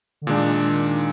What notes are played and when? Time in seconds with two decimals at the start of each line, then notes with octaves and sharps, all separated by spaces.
0.22 D3
0.26 A#2 D#3 G#3 D4